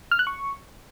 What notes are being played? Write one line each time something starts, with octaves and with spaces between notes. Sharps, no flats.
F6
F#6
C#6